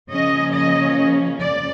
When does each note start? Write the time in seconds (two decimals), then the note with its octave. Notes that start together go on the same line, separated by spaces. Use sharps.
0.10 C#3 F3 A#3 C#4 D#5
0.54 D#5
1.41 D5